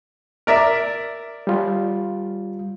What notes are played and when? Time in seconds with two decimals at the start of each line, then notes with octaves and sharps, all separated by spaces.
0.47 A#4 D5 E5
1.47 G3 F4